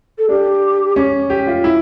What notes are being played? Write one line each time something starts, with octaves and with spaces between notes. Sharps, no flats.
A4
D4 G4
C#4
G4
F4
E4